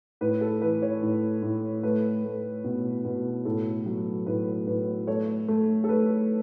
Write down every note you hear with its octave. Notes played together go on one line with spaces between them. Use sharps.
A2 B4
A4
E3 B4
C#5
A2
A2
A3 B4
A3
B2
B2
A2 A4
F#3
A2 B4
A2 B4
A3 C#5
A3
A4
A3 B4